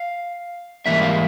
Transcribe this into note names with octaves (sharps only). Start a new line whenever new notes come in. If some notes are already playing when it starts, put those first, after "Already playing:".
Already playing: F5
G#2 E3 G3 A#3 E5
F5